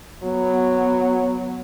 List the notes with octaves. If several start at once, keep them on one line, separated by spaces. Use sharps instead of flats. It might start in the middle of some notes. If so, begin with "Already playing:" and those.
F#3 B3